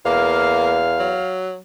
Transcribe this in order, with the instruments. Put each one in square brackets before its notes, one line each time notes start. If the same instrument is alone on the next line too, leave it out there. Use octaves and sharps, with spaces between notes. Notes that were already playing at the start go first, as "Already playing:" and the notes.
[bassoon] E2 [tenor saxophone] A#3 [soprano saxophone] F5
[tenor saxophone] F#3